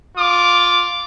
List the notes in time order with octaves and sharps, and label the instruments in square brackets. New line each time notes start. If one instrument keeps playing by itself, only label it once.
[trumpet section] F4 D6